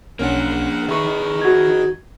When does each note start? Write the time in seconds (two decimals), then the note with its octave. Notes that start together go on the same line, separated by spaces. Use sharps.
0.19 B1 A#3 C#4 D4 A#4 F#5
0.89 D#3 D#4 G#4 B4 E5 C#6
1.42 F#4 G#6